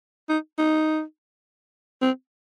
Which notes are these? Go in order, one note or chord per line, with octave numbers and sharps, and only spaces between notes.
D#4
D#4
C4